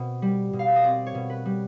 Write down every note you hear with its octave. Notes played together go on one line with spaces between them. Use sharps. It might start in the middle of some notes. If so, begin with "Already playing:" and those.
Already playing: B2 C4
G3
B2
F5
E5
D#5
C4 D5
C#5
B2
B4
G3